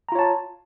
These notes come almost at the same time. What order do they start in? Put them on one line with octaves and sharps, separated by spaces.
A#5 F4 C#5 A5